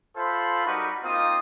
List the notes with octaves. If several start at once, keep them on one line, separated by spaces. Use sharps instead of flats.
F4 A4 C5 E5 B5
G3 D#4 F#4 A#4 B4
A#3 C4 D#4 F4 D#6